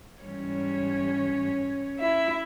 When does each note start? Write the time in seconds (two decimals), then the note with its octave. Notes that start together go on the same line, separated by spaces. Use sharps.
0.23 G#2 E3 G3 C#4 C#5
1.99 E4 E5